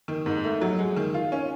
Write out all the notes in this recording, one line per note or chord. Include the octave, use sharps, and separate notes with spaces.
D#3
G#2
A3
F#3
G#3
D#3
F4
C#4